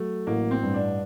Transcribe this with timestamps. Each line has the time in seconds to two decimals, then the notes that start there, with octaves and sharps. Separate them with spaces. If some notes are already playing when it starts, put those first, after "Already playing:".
Already playing: F#3 A3
0.27 A1 A#3
0.51 C4
0.63 G2
0.74 D4